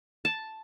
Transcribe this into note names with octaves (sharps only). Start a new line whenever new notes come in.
A5